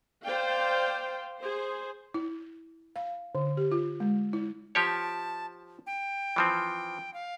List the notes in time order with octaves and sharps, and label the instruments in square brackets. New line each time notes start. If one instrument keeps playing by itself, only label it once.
[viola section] C5 D5 F5 G5
G#4 C5
[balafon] E4
F5
D3
G4
F4
G#3
E4
[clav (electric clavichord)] F3 G4 C#5 [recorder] A5
[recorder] G5
[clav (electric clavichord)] E3 F3 C4
[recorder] F5